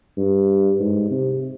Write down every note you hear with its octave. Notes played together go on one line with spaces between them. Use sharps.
G2
G#2
C3